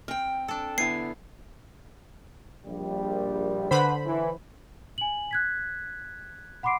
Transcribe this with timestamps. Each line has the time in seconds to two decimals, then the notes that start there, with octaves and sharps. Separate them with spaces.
0.08 C4 G5 F6
0.48 D4 A4
0.78 D3 B3 E4 G#5 C7
2.66 A#1 G3
3.71 D3 B4 C5 F#5 B5
4.04 E3
4.98 G#5 F#7
5.31 F#6 G#6 B6
6.63 F#5 B5 C6 D6 C7 D7